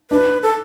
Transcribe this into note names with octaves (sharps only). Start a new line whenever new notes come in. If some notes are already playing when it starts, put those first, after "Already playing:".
D4 B4
A4